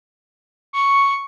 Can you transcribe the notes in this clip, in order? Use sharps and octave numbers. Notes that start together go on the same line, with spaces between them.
C#6